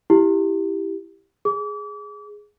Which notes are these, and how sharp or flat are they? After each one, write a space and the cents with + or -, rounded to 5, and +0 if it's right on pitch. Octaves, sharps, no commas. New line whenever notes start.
E4 +0 G4 +0
G#4 +0 D6 -35